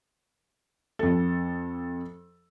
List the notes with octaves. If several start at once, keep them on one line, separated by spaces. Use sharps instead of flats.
F2 A4